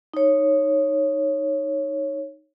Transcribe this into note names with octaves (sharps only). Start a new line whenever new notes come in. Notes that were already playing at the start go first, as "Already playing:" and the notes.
D#4 C#5